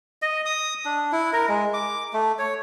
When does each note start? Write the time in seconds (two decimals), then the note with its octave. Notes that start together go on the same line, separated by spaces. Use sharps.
0.22 D#5
0.46 D#6
0.85 D4
1.12 E4
1.33 A#4
1.49 G#3
1.74 D6
2.13 A3
2.39 C#5